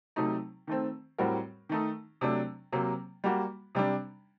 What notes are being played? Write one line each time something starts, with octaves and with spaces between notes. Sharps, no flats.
C3 F#3 A3 D#4
D#3 A3 C4
A2 G3 C4 F#4 A#4
D#3 A3 D#4
C3 F#3 A3 D4
C3 F#3 A#3
G3 A#3 F#4
C3 G3 D4